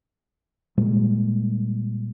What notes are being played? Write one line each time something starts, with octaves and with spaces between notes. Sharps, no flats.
A#2 G3 G#3